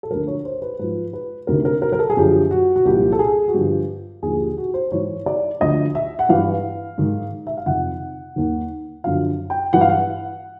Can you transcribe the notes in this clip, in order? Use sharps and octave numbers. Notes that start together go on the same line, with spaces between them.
A4
D2 D3 F3 A#4
C#5
C5
B4
G#2 F3 B4
B4
D2 C3 D#3 A#4
A#4
A#4
A#4
A4
G#4
F#2 D3 F3 G4
F#4
F#4
C2 A#2 F3 G4
A4
G#4
F#4
G2 D3 F3 G4
D#2 D3 F3 G#4
G4
G4
F#4
C5
G#2 E3 C#5
D5
D2 D3 F3 D#5
E5
F#5
G2 E3 F5
G#2 D#3
E5
F5
F2 C3 D#3 F#5
D#2 D#3
F#2 D3 F3 F5
G5
G2 E3 F#5
F5
F#5